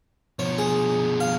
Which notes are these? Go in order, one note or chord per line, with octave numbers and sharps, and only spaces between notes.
B2 F3 C#5
G#4
F5